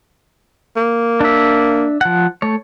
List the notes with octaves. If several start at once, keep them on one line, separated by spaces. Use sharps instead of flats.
A#3
D4 E5
F3 F#5
A3 C#5